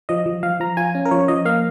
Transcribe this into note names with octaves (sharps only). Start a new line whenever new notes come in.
F3 D#5
F3
F3 F5
F3 A#5
F4 G#5
C#4
A#4
F3 C#5
F3 D#5
A#3 F5